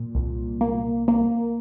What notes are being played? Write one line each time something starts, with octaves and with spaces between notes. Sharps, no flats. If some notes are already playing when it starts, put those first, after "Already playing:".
Already playing: A#2
C2
A#3
A#3